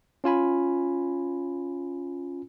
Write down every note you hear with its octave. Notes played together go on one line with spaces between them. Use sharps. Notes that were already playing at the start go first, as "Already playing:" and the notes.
C#4 F4 G#5 B5